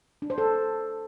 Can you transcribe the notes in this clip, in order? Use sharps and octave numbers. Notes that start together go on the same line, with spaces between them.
D4
C5
A4